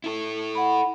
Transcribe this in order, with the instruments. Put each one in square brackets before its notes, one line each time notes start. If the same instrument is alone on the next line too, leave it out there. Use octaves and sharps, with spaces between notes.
[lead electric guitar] E4 A4
[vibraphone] F#5 B5